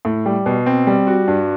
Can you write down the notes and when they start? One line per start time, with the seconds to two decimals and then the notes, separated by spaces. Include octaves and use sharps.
0.05 A2
0.26 G3
0.46 B2
0.66 C4
0.87 G3
1.07 F#4
1.28 G2